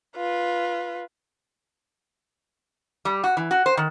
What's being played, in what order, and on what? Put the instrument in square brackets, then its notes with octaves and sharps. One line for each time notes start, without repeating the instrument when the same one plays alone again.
[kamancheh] F4 B4
[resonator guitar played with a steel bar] G3
F#4
E3
F#4
C5
D#3